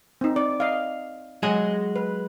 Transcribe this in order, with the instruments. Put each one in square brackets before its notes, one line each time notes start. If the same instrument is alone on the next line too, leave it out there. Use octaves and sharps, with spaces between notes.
[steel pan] C4 D#4
D5
D#5 F5
[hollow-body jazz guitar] F#3 G#3 G#4
[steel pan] B4